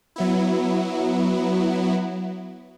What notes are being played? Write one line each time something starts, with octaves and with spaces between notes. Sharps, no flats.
F#3 B3 E4